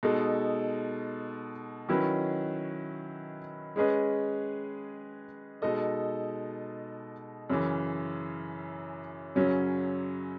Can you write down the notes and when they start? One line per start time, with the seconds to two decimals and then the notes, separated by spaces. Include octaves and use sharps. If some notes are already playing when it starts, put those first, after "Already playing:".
0.03 B2 G#3 D#4 A4
1.89 D#3 F#3 C#4 E4 B4
3.76 G#3 C#4 G#4 B4 D#5
5.62 B2 G#3 D#4 A4 D#5
7.50 F#2 C#3 E3
9.35 F#2 C#3 F#3 C#4